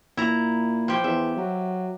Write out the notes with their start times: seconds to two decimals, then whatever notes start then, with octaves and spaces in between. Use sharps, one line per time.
0.17 A#2 E4 A#5
0.88 F3 G4
1.04 E2 E5
1.37 F#3